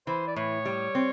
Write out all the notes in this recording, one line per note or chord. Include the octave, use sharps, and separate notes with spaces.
E3 C5
D5
A2 C#5
G3
C4